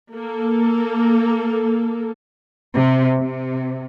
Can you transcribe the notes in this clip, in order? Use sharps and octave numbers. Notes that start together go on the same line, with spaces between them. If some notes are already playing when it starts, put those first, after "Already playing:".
A#3 A4
C3
C3